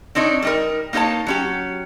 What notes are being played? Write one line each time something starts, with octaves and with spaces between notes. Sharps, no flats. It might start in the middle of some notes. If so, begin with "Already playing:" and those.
C4 D4 D#4 C#5
G3 D#4 A#4
A#3 D#4 A4 C#5 A5
F#3 C#4 G4